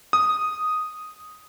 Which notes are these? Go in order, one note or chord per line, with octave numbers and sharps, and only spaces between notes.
D#6